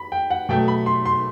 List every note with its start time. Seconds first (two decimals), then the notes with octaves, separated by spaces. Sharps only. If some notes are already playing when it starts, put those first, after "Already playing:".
Already playing: B5
0.12 G5
0.30 F#5
0.49 B2 F#3 A3 G5
0.68 B5
0.86 C6
1.05 C6